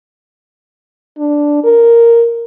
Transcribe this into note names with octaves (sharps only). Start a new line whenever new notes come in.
D4
A#4